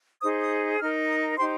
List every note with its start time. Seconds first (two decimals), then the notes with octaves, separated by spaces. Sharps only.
0.22 D#4 G#4 C5 D#6
0.41 D#6
0.80 D#4 A#4 F6
1.08 D#6
1.37 D#4 G4 C5 C6